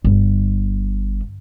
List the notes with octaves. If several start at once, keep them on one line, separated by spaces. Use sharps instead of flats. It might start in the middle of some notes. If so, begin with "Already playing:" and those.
G1